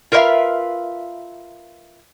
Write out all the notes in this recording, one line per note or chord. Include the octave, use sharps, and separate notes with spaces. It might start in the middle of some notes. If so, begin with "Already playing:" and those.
F4 A#4 B4 C#5 E5 F5